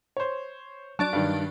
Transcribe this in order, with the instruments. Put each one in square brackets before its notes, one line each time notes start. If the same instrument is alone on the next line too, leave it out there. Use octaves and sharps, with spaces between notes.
[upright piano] C5 C#5
[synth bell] F#3 D4 D5 [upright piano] A5
[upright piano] G2 D#3